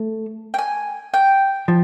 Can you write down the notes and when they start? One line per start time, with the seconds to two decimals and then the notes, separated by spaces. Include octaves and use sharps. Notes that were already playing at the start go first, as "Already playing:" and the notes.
Already playing: A3
0.54 G5
0.58 G#5
1.14 G5
1.68 F3